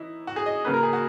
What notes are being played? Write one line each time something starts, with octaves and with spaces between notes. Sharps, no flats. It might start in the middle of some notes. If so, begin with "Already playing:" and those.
Already playing: E3 D#4 E4
F#4
G#4
D#5
C#3 F#3 A#3 B4
A#4
G#4
F#4